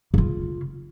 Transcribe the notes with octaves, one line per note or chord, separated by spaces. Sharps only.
C#3 F4